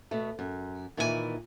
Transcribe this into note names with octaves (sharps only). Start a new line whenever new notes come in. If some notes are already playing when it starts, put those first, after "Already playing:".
B2 A3
F#2
A#2 D#3 E3 E4 A4 G#5